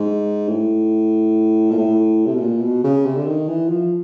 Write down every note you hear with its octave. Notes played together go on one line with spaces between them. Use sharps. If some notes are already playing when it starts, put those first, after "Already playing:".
Already playing: G#2
A2
A#2
A2
C3
B2
A#2
B2
C#3
C3
D3
D#3
E3
F3